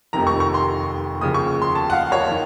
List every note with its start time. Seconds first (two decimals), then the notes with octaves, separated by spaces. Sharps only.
0.13 F1 F2 C3 D#3 A#5
0.27 C#6
0.40 C#6
0.54 C6
1.21 D#2 C#3 F3 D#6
1.34 C#6
1.62 C6
1.75 A5
1.90 F#5
1.93 F5
2.12 C#5
2.30 D#3